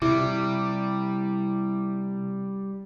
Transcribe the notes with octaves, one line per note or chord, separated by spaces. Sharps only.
C3 G3 E4 D6